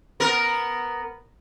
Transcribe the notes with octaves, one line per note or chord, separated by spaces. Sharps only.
B3 A#4